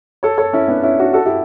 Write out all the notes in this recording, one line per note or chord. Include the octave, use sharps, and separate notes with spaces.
A4 C#5
A4 C#5
C#4 E4
B3 D4
C#4 E4
D4 F#4
F#4 A4
E4 G4